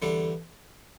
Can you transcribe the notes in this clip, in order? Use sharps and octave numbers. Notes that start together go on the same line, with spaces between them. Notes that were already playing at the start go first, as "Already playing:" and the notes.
E2 D3 G3 D4 A4